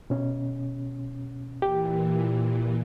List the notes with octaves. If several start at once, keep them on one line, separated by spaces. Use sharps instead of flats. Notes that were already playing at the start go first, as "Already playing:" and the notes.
B2 C#4
A#2 E3 G4